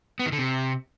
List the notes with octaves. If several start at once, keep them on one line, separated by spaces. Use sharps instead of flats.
B3
D#3
D3
C3